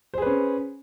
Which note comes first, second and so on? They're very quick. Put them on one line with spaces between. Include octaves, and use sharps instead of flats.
C5 G#4 B4 C#4